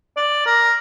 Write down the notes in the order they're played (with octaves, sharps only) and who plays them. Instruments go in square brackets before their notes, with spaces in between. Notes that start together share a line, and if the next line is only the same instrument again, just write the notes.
[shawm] D5
A#4